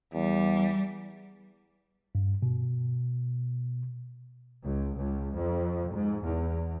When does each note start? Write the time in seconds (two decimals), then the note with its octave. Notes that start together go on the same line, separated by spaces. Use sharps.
0.14 E2 G3
2.15 G2
2.43 B2
4.63 C#2
4.97 C#2
5.36 F2
5.94 G#2
6.24 E2